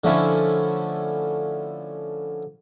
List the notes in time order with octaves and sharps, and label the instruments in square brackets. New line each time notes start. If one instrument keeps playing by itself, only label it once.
[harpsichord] D3 F3 A3 C#4 E4 C#6